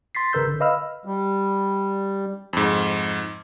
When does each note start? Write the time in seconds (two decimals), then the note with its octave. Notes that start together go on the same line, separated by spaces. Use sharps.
0.15 C6 A6 B6 C7
0.33 G#1 C#3 A#4 B4 E6 G6
0.47 D3
0.60 B4 D#5 F5 B5 E6 F6
1.05 G3
2.53 F2 G#2